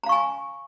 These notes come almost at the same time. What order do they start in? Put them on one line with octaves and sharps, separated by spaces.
A#5 F5 C#6 G#5